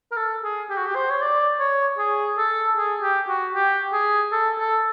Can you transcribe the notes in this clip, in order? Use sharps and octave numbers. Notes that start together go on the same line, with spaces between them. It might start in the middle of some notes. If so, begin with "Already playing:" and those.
A#4
A4
G#4
G4
F#4
G4
C5
C#5
D5
C#5
G#4
A4
G#4
G4
F#4
G4
G#4
A4
A4